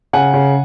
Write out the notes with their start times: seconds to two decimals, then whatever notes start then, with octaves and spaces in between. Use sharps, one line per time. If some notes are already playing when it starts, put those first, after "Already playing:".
0.13 C#3 F#5 G#5
0.34 C#3